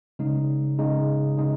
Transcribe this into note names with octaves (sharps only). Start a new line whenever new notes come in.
C#3 G#3 D#4
C#3 G#3 D#4
C#3 G#3 D#4